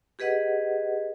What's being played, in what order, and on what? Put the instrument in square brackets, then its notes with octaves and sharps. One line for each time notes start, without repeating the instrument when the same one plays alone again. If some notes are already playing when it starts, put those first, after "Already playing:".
[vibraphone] G4 G#4 B4 D#5 F#5